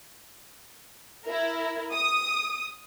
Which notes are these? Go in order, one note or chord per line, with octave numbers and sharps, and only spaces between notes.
E4 A#4
D#6